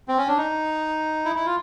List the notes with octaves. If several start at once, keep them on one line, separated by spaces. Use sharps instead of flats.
C4
C#4
D4
D#4
E4
E4
F4